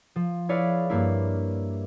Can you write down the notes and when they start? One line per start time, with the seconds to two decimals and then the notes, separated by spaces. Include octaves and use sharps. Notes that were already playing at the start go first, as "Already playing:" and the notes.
0.16 F3
0.49 E4 G#4 B4 C#5 D5 F5
0.90 G2 A#3 E4